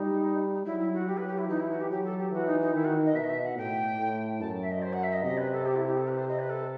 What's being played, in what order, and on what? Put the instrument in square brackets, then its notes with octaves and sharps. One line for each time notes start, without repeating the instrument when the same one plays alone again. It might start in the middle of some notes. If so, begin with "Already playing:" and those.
Already playing: [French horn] G3 [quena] D#4
[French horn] F#3 [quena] E4
[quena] E4
F#4
[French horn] F#3 [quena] G4
[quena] B4
G4
E4
[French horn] E3 [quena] D#4
[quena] E4
F#4
G4
[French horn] F#3 [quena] G4
[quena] A4
G4
[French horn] E3 [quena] F#4
[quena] D#4
D#4
[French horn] D#3 [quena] E4
[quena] F#4
D#5
[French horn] B2 [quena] E5
[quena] D#5
E5
F#5
[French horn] A2 [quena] G5
[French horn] A2
[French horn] F#2 [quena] A5
[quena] E5
D#5
C5
F#5
E5
D#5
[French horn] C3 [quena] D#5
[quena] B4
A4
G4
E4
G4
A4
B4
C5
D#5
B4
A4